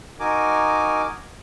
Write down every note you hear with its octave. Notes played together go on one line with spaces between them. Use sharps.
D#4 F#4 A#4 G#5 D6